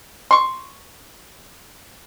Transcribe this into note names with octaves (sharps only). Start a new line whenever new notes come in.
C6 C#6